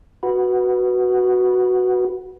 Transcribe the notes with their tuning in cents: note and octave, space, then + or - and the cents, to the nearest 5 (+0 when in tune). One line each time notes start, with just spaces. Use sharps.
F#4 +0 B4 -5